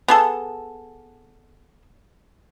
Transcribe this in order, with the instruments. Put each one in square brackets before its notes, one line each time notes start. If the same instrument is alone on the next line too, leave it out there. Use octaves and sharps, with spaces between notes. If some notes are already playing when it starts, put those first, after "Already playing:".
[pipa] B3 G#4 A4